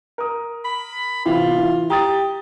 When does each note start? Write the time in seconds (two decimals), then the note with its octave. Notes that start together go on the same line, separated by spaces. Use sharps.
0.18 A#4 D#6
0.65 B5
1.26 E2 A2 C3 F4
1.58 E3
1.90 G4 A#5 D#6 A6